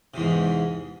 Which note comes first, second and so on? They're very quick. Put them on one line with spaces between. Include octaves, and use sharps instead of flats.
C3 E2 G#2